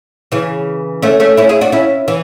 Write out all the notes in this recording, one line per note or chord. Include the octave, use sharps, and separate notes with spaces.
C#3 E3
A3 C#4
A3 C#4
C#4 E4
E4 G#4
D4 F#4
C#4 E4
E3